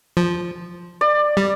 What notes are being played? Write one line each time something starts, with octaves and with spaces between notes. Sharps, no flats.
F3
D5
G3